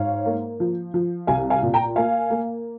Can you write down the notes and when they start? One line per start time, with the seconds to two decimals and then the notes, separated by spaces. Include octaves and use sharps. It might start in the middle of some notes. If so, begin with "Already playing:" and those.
Already playing: G#2 C#5 F5
0.26 A#3
0.60 F3
0.94 F3
1.27 C2 F5 G#5
1.50 F5 G#5
1.63 A#2
1.74 G5 A#5
1.96 A#3 F5 G#5
2.30 A#3